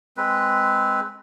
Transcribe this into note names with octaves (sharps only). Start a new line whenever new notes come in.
G#3 C4 B4